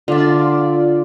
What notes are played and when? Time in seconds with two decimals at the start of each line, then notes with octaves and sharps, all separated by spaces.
0.08 D3 F4 D5 E5